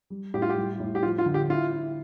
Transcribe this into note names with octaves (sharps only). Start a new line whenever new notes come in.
G3
A2 G4
F4
G4
G3
A2
G4
F3 F4
F4
D3
G4
E4 F4
E4